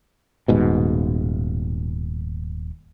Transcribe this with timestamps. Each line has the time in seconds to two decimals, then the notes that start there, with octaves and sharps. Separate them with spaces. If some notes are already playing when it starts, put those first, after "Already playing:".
0.48 D#1 G#2 B2